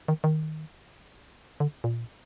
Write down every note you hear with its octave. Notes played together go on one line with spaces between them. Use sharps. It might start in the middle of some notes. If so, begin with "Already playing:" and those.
D#3
D#3
D3
A#2